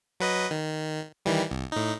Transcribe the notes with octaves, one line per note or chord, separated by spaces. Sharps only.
F#3 B4 D#5
D#3
D#3 E3 G3
C2
A2 D#4